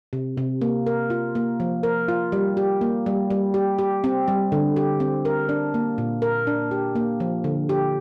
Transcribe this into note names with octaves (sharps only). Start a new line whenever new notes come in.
C3
C3
A#3
A#4
F4
A#3
F3
A#4
F4
G3
G4
A#3
G3
G3
G4
G4
C4
G3
D3
G4
C4
A#4
D4
A#3
A#2
A#4
D4
G4
A#3
F3
D3
G4